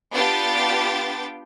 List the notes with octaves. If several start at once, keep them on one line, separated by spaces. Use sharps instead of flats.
B3 D4 F4 G4 G5 A6